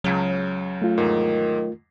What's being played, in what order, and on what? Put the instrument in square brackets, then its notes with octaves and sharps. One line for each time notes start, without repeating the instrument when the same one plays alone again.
[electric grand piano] C#2 C#3 [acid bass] F#3
[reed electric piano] A3 F4
[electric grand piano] E2 G#2 [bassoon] D#3